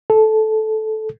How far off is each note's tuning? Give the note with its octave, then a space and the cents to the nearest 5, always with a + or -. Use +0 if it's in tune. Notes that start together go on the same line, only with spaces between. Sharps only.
A4 -15